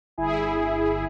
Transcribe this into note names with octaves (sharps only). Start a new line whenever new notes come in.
G1 E4 G#4